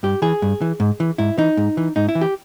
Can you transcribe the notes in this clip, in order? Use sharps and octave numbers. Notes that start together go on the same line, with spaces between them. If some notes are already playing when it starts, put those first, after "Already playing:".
G2 G4
E3 G#4
G2
E3
G#2
E3
G#2 E4
E3 D#4
G#2
E3
G#2 D#4
E4
E3
G4